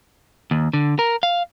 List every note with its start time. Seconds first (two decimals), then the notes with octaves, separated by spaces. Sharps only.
0.51 D#2
0.73 D3
0.99 A#4
1.23 F5